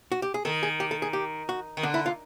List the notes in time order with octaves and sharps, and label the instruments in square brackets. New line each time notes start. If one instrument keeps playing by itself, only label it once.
[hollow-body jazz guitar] F#4
G4
G#4
[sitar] D#3 [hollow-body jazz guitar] A4
[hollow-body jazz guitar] G#4
G4
A4
G#4
G4
F#4
[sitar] D#3
[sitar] D3 [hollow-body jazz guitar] D4
[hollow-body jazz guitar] E4
F4